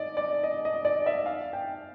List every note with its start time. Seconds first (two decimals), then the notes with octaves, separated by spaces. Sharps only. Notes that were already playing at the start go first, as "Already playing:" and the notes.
Already playing: D5 D#5
0.17 D5
0.43 D#5
0.65 D#5
0.85 D5
1.06 E5
1.26 F5
1.53 G5